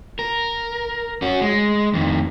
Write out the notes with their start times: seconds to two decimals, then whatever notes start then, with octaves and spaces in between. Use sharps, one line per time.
0.19 A#4
1.22 C#4 F#4
1.41 G#3
1.94 F2 D#3